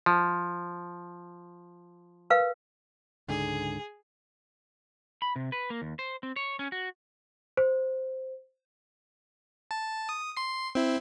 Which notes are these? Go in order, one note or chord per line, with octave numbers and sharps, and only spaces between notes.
F3
A#4 B4 F5
C#2 G#2 D3 G#4
B5
C3
B4
A#3
D#2
C5
C4
C#5
C#4
F#4
C5
A5
D#6
C6 C7
C4 E4